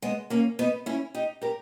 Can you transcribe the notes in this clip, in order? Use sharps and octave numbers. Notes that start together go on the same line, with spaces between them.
G#3 B3
A#3 C#4
B3 D#4
C#4 E4
D#4 G4
G4 A#4